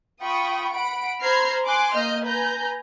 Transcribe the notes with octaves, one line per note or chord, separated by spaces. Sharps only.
F4 G5 B5 C#6 D#6
F#5 B5 D7
C5 A#5 B5 F6 G#6 C7
G#5 C6 D6 F#6
A#3 D#5 F6 G6
B4 G#5 A#5 G6